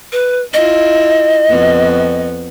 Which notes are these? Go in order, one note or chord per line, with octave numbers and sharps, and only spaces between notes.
B4
E4 F4 D#5
F2 B3